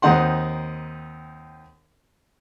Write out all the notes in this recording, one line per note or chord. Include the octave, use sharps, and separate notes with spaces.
D#2 C4 D#4 F#5 C6